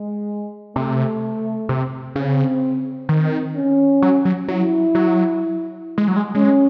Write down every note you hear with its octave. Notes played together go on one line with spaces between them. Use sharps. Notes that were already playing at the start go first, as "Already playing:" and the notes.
Already playing: G#3
C3 A3
C3
C#3 C4
D#3 C4
C#4
F#3
F#3
F#3 E4
F#3
G#3
F#3
G#3
G#3 C#4